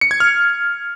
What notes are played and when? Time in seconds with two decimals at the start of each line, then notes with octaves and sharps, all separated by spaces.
0.01 C#7
0.11 G#6
0.20 F6